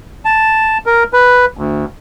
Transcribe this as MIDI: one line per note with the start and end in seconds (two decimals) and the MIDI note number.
0.25 0.78 81
0.86 1.03 70
1.13 1.45 71
1.57 1.85 38